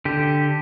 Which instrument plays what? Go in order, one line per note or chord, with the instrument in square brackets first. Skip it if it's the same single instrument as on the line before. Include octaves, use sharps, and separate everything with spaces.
[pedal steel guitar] D3 G4